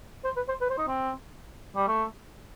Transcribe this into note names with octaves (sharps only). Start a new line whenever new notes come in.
C5
B4
C5
B4
C5
D#4
C4
G3
A3